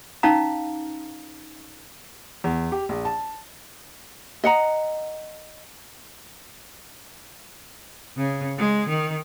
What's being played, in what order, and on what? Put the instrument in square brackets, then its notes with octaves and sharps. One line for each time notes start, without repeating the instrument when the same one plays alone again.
[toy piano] C#4 D#4 F5 A#5
[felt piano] E2
G4
A#1
A5
[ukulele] D#5 F#5 A#5
[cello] C#3
G#3
D#3